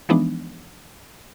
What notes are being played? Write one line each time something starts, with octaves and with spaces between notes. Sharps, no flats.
E3 F3 G#3 B3 D4 D#4